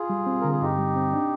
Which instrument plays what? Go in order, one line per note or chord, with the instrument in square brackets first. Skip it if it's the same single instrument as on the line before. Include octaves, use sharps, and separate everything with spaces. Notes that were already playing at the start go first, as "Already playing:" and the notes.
Already playing: [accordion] F4 G#4
[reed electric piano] G3
C4
[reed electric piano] D3 [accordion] A#4
[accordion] G#4
[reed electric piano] G2 [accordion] D#4 G4
[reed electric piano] G3
C4
D4